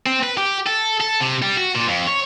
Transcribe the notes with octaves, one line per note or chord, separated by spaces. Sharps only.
C4
B4
G4
A4
A4
C3
G3
F#4
A#2
F2
C#5